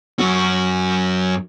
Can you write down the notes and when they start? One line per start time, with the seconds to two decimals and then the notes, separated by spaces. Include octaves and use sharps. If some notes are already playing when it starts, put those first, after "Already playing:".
0.19 F#2 F#4